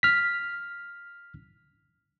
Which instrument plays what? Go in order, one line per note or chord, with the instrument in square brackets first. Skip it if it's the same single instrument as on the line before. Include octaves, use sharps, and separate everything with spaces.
[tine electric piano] F6 B6